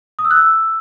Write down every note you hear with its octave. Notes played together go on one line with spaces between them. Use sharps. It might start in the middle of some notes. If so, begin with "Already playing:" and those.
D#6
E6
F#6
E6